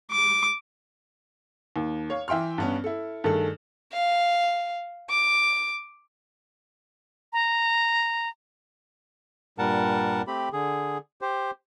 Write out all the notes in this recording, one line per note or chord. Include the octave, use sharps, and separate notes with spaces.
D6
D#2
C#5 F5
E3 E5 G5 C6 F6
G2 B3 C#4
E4 A4
G2 D#3 A3 G#4 A4
F5
D6
A#5
G2 A#2 G3 A#4 F#5 A5
A3 C4 G4 B5
D3 G#4
G4 C5